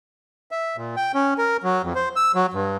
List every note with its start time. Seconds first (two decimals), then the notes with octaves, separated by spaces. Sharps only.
0.51 E5
0.77 A#2
0.97 G5
1.14 C#4
1.38 A#4
1.63 F#3
1.83 F2
1.95 C5
2.16 E6
2.35 F#3
2.54 G2